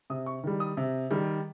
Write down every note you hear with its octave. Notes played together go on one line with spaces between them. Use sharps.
C3 D#6
C#6
D#3 G3
D#6
C3
D#3 G3